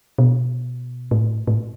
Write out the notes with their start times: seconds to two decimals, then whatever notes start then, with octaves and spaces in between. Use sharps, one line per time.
0.18 B2
1.11 A2
1.48 A2